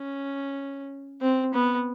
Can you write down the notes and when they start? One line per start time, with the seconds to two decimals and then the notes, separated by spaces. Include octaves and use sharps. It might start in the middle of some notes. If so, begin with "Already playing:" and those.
Already playing: C#4
1.21 C4
1.54 B3